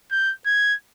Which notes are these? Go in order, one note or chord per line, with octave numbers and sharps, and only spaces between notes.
G6
G#6